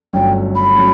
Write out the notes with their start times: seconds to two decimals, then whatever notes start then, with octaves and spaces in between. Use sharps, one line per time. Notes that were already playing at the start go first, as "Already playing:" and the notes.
0.13 G1 G2 F#3 A3 C#4 G5
0.56 B5
0.76 F#3 A3 C#4